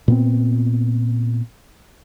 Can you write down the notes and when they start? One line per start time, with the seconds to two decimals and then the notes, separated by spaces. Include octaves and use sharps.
0.08 A#2 B3 C4